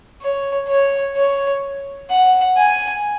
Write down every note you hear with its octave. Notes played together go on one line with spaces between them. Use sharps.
C#5
C#5
C#5
F#5
G#5